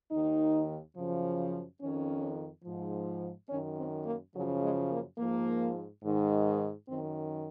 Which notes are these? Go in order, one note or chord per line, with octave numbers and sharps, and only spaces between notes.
D#2 D#3 D#4
F#2 C#3 F3
F2 D#3 C#4
G#2 F3
F#2 D#3 C#4
C4
A#3
F#2 C#3 F3 F#3
G#3
A#3
G#2 F3 A#3
G#2 D#3
F#2 D#3 C4